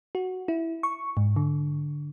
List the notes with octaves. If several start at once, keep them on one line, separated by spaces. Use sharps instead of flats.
F#4
E4
C#6
G#2
D3